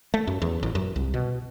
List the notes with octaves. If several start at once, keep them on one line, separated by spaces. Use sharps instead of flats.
A3
F#2
E2
A1
F#2
C2
B2